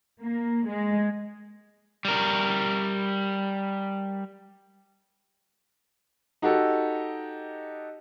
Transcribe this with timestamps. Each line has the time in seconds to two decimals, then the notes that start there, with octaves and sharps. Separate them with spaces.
0.21 A#3
0.68 G#3
2.05 G3 A#4
6.42 D#4 F#4 G4 A4